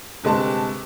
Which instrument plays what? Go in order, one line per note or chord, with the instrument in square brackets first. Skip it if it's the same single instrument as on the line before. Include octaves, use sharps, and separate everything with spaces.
[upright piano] G1 C3 G#3 A5